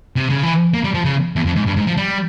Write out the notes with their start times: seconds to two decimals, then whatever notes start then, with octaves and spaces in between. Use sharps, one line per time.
0.16 C3
0.30 C#3
0.43 E3
0.74 A#3
0.84 G3
0.94 F3
1.05 C#3
1.36 E2
1.46 F2
1.56 G#2
1.66 G2
1.76 G#2
1.87 F3
1.97 G3